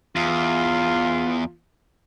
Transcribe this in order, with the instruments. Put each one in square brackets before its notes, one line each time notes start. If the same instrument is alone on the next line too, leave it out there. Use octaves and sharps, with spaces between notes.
[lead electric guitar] E2 [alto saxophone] F4